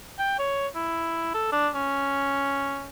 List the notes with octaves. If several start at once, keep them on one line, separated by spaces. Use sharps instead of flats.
G5
C#5
E4
A4
D4
C#4